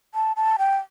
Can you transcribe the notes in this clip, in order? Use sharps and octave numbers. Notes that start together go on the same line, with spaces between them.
A5
A5
G5